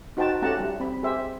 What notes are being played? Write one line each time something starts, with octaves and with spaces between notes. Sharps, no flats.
D#4 F#4 C5 G5 A5
A3 C#4 G4 F#5 A5 A#5
G3
C4 B5
G4 G#4 C5 E5